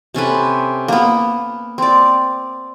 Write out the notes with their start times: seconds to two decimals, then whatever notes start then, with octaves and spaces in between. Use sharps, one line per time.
0.14 C3 C#4 A4 B4
0.88 A#3 B3
1.78 C4 D5